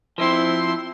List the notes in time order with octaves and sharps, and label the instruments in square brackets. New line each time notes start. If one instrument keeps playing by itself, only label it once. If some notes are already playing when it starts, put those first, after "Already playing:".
[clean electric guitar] F3 C4 [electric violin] E4 C6